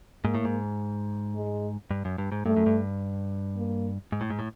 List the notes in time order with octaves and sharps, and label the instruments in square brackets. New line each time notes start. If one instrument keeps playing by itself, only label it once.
[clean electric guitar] G#2 [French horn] A#3
[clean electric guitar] A2
G#2
[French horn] G#3
[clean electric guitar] G2
F#2
G2
G#2
[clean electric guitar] G2 [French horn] A3
[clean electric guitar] F#2
G2
[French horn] A#3
[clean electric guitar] G#2
A2
G#2
A2